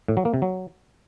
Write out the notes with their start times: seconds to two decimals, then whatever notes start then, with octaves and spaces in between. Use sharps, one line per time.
0.08 A2
0.17 F#3
0.25 A#3
0.34 C3
0.42 F#3